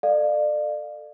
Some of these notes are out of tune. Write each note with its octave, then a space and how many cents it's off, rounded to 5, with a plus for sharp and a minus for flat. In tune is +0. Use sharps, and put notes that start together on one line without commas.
A4 +15 D5 +30 F5 +0